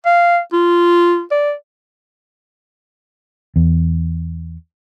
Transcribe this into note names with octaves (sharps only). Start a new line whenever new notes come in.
F5
F4
D5
E2